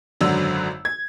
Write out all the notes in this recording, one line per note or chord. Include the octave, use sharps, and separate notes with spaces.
G#1 F#2 D3 F#3 E6
G#6